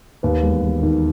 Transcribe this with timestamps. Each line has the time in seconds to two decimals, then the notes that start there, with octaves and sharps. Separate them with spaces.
0.23 D#2 B4
0.43 E1
0.63 E1
0.83 D#3